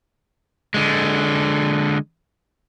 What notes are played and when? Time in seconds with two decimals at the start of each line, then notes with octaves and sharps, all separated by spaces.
0.74 D3 G#3